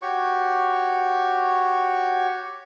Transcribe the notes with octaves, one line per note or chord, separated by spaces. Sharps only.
F#4 G4 C#5 C#6